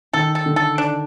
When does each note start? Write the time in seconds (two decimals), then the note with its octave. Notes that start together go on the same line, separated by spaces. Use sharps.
0.13 D#3 A4
0.35 A4
0.46 D3
0.56 A4
0.78 D4